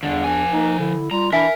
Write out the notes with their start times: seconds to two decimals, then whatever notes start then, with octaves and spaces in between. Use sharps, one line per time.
0.03 E2 G2 D3
0.24 F3 D4 G#5
0.53 A#3 D#4
0.79 D3 E4
1.11 G3 F4 A#5
1.33 E3 D4 A#4 E5 G#5 B6